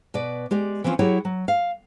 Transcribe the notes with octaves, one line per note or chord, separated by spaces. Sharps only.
B2 B4 D5
G#3 G4 D5
E3 F3 C4 C#4 F4
F#3 E4 G4 G#4 C#5
F#3
F5